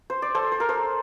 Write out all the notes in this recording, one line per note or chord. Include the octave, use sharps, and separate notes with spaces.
C5
D5
A4 C5
C5
A#4
A4 C5